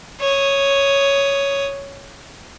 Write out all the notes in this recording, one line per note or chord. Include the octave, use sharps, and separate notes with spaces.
C#5 D#6